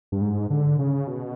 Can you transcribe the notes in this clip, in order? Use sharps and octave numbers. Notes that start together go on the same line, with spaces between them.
G2
G#2
D3
C#3
B2